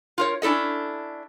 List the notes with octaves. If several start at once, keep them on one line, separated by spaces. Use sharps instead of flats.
F4 A#4 C#5
C#4 D4 E4 A4 D#5